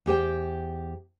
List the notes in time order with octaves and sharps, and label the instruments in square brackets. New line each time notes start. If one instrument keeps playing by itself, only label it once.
[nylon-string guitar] E2 G4 C5 G5